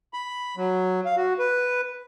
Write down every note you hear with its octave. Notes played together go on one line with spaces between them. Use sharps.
B5
F#3
F5
F#4
B4